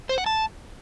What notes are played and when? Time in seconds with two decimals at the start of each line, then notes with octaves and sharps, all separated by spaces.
0.09 C5
0.18 F#5
0.26 A5